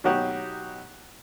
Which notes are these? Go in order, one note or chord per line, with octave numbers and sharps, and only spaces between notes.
B2 F#3 D#4 F#4 G4